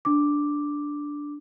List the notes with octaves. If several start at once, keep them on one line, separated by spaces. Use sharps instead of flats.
D4 D6